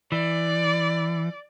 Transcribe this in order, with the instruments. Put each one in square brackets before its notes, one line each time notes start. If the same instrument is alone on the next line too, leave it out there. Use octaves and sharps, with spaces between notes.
[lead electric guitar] E3 [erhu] D5